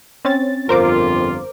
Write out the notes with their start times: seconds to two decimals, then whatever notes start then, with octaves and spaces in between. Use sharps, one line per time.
0.25 C4 C#4 A6
0.69 G1 F2 F4 A#4 C5 D6